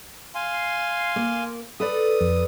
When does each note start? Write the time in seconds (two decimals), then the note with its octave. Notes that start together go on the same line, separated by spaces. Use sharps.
0.35 F5 G#5 C6
1.16 A#3
1.80 A4 B4 D5 D#6
2.21 F2